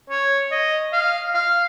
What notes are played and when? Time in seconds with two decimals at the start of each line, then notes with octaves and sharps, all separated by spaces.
0.10 C#5
0.52 D#5
0.93 F5
1.35 F5